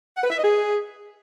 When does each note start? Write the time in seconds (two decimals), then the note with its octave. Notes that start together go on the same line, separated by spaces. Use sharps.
0.17 F#5
0.23 B4
0.30 E5
0.37 D#5
0.44 G#4